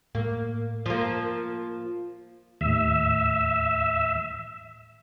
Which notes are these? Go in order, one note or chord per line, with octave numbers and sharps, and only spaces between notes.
A2 A#3
F3 A#3
D#2 A2 E5